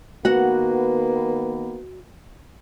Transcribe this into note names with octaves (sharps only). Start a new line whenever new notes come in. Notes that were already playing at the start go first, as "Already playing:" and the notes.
D#3 A#3 B3 F#4 F#5